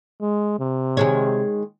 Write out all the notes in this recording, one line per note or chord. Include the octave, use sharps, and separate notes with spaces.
G#3
C3
D#3 G#3 C#5